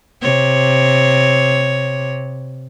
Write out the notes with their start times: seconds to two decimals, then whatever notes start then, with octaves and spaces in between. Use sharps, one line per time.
0.22 C3 C#5